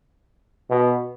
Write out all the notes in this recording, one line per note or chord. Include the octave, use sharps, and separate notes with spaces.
B2